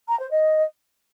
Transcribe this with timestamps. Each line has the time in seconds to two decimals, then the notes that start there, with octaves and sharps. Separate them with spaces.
0.08 A#5
0.19 C5
0.31 D#5